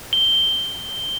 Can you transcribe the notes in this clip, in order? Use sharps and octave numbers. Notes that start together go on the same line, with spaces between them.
G7